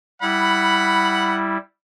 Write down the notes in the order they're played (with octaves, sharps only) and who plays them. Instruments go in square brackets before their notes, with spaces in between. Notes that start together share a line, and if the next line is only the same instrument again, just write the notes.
[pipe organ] G3 E4 [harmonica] F#5 B5